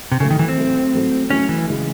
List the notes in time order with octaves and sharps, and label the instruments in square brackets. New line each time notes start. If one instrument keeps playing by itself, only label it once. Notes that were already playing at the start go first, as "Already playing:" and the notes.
[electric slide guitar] C3
[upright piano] A2 F#3 A3 [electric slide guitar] C#3
[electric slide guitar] D#3
E3
C4
[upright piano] A2 F#3 A3
A2 F#3 A3
[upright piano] A2 F#3 A3 [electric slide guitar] C#4
[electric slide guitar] E3
[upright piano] C#3 E3 G#3